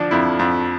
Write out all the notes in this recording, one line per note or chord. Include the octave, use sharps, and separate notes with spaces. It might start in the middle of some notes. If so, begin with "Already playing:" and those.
Already playing: D3 F3 D4 F4
F2 E4
F2